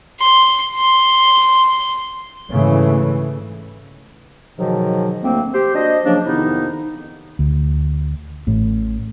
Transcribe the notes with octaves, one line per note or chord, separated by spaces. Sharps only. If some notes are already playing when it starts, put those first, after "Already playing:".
C6
C6
G#2 C#3 E3 A3
G#2 B2 D3 D#3 F3 F#3
D2 A3 A#3 C4
G4 C5
D4 F#4 C5 D#5
C#3 F3 F#3 A#3 D4
F2 C3 D#3 B3 D#4 E4
D2
A1 A2